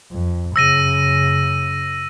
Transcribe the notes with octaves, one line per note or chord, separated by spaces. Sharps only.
F2
F#2 C#3 E6 A#6 D#7